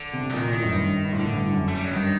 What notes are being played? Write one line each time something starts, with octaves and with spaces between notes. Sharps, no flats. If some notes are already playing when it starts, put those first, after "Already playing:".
Already playing: D3
C3
F#3
A#2 D#3
A#2
A2 D#3
F#2
G2
G2
A2 D3
G2
F#2
A3
G3
F#3
G2 D#3